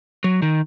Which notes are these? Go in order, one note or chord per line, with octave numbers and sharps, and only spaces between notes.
F#3
D#3